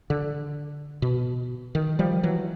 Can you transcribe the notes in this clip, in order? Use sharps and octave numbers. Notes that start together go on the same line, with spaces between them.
D3
B2
D#3
F3 G3
E3 F#3